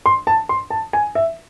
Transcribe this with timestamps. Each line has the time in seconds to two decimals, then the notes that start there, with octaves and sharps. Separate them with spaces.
0.06 C6
0.27 A5
0.49 C6
0.70 A5
0.93 G#5
1.15 E5